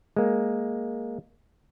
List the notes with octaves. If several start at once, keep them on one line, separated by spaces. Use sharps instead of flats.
G#3 A#3